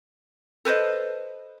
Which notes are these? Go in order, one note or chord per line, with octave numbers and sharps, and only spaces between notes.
A4 B4 C5 D#5